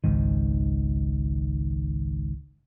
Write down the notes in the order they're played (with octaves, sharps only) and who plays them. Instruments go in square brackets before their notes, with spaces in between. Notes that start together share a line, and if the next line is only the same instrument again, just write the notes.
[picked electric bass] G#1 C#2 G#2 D#3